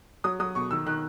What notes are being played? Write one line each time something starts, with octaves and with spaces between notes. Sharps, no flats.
F#3 D#6
F#3 D#6
B2 C#6
D#3 E6
D#3 F#6